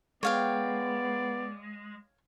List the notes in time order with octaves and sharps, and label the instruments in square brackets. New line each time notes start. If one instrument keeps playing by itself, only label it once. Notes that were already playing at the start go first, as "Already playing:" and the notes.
[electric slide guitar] G#3 [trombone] B3 [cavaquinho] C#5 F5 G5 [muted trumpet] D5